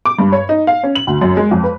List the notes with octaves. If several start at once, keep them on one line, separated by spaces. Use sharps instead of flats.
D6
G2
C#5
D#4
F5
C#4
F#7
D2
F#2
G#3
F2
B4